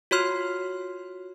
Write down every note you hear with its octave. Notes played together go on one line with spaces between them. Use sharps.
F4 F#4 C#5 C6 F6 C7